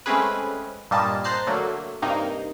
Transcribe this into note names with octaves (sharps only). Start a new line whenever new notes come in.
G#3 A3 C4 C#4 G#4 B4
G2 A#2 G3 A#3 D#5 A5
C5 A#5 F#6 A6 C7
D3 F#3 A3 A#3
G2 C3 A#3 D#4